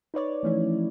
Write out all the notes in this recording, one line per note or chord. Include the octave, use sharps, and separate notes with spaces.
D#4 B4 C#5 D5
E3 F3 A3 C#4 D#4 E4